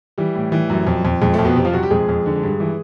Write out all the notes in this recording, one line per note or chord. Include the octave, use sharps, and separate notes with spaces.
E3 G3
A2
E3
F#2
F2
F2
F2 G#3
A2 A3
F2
B2 B3
C3 C4
F3 F4
C3 F#3 F#4
G3 G4
F2 G#3 G#4
F2
D3
G2
E3